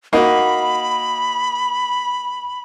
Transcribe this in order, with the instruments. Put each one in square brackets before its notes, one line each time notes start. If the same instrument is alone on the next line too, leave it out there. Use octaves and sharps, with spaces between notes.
[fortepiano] A#3 D#4 [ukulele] F#4 F#5 [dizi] B5